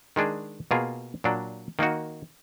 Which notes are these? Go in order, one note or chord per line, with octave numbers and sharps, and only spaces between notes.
D#3 G#3 D4 G#4
B2 A#3 F4 G#4
A#2 F#3 D4
D#3 A#3 D#4 F#4